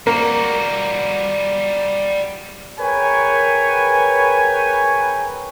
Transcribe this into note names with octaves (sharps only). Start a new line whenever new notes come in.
G3 A#3 F#4
G#4 A#4 B4 C#5 G5 G#5